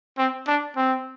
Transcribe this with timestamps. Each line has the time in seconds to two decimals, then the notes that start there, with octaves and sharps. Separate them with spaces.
0.18 C4
0.47 D4
0.77 C4